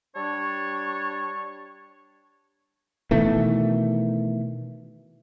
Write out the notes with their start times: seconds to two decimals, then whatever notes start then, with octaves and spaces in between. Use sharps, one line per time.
0.15 G3 D4 C#5 A5 C#6
3.11 B2 D#3 E3 A3